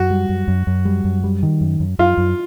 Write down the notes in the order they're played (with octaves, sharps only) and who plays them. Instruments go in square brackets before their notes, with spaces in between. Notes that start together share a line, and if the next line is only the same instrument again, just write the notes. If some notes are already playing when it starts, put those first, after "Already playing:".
Already playing: [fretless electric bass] F#2 [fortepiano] F#4
[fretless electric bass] G3
F#2
F#2
F#2
G3
F#2
G3
D#3
F#2
F#2
[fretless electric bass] F#2 [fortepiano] F4
[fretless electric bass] F#2